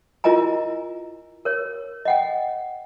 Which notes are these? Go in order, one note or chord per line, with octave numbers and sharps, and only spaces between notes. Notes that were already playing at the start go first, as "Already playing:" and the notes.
E4 F4 A#4 D#5 G#5 A#5
A#4 C#5
D#5 F#5 G5